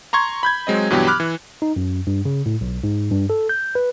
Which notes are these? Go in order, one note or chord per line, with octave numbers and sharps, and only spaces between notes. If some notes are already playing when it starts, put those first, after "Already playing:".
A#5 C6 C#6 G#6
B5 G6 G#6
F#3 G#3 C4 D#5
G2 B2 E3 F#3 B3 G4
B5 D6 F6 F#6
E3
D#4
F#2
G2
C#3
A2
B1
G#2
G2
A4
G6
B4